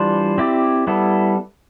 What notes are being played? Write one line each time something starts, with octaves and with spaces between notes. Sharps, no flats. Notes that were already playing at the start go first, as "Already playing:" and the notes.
Already playing: E3 G3 D4 F4 C5
C4 E4 G4 D5
G3 B3 E4 A4